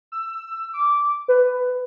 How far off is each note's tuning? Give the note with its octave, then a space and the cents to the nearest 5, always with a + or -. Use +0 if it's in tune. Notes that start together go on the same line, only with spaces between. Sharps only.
E6 +15
D6 -10
B4 +15